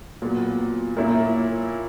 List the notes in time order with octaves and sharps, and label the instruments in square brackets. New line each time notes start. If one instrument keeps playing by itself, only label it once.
[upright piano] A#2 F#3 B3
A#2 A#3 C#4 E4